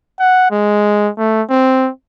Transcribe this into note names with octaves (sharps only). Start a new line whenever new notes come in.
F#5
G#3
A3
C4